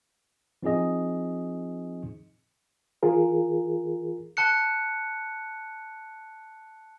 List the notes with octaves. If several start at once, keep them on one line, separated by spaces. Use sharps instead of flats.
F3 C4 D#4 G#4 D#5
E3 F4 G#4 A#4
A5 F#6 C#7